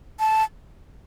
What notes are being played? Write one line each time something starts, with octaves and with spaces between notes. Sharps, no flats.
A5